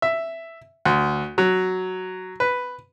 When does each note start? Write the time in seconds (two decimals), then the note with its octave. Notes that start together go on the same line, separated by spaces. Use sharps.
0.02 E5
0.85 D2
1.38 F#3
2.40 B4